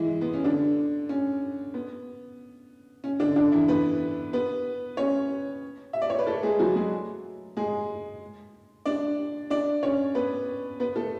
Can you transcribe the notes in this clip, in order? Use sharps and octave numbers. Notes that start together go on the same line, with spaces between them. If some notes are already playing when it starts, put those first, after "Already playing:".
Already playing: E3 G#3 E4
B3
C#4
D3 D4
C#4
B3
C#4
D3 D4
D3 D4
E3 E4
B3 B4
B3 B4
C#4 C#5
E5
D5
C#5
B4
A3 A4
G#3 G#4
F#3 F#4
G#3 G#4
G#3 G#4
D4 D5
D4 D5
C#4 C#5
B3 B4
B3 B4
A3 A4